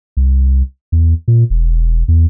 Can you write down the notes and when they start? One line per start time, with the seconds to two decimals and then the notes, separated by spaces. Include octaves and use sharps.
0.17 C2
0.92 E2
1.28 A#2
1.50 E1
2.08 E2